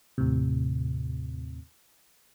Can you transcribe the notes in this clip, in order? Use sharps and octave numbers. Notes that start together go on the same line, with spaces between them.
D#2 A2 C3